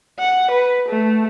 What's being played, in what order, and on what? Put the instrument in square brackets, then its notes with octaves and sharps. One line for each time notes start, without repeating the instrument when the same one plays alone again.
[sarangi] F#5
B4
A3